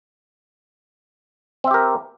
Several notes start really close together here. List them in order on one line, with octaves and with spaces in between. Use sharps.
C4 E5 G4 A#4